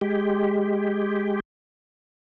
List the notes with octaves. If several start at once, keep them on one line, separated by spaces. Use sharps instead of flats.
G#3 G4